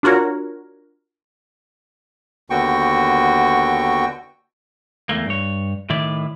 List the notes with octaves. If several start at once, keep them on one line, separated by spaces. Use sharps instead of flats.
D4 F4 F#4 A#4 C#5
D#2 D3 B3 F#4 G5 C#6
E2 A3 A#3
G2 C#5
A2 D#3 E4 D5